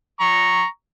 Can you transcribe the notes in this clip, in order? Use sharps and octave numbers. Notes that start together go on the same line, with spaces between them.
A#5 C#6